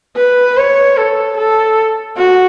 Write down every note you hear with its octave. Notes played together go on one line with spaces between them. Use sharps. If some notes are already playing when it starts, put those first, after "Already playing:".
B4
C#5
A4
A4
F#4